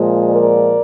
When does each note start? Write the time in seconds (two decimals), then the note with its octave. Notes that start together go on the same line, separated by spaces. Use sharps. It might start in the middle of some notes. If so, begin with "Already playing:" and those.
Already playing: A#2 F3 G#3
0.30 A#4 D5